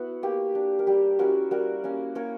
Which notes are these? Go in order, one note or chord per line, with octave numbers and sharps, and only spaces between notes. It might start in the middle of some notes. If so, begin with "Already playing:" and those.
Already playing: B3 E4 F#4
A#3 G4
D4
A#4
G3 G4
C#4 E4 F#4 A#4
G3 F#4 A#4
A#3 C#4
A#3 A#4 C#5